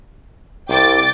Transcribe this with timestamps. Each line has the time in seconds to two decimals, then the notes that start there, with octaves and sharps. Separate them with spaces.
0.69 C2 G5 D6 A6